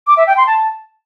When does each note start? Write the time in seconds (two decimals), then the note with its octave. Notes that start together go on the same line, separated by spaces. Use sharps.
0.07 D6
0.17 E5
0.27 G5
0.37 C6
0.47 A5